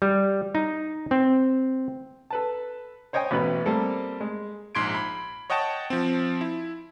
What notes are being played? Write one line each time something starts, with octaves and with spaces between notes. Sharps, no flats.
G3
D#4
C4
A4 B4 A5
C5 C#5 D#5 G5 G#5
A1 B2 B4
G3 A#3 C4 A4
G#3
A#1 G#2 C6 G#6 D7
B5
C#5 D#5 F#5 G5 A5 C#6
F3 C4
E4